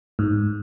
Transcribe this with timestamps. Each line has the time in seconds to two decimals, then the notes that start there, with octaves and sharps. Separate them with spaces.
0.19 G#2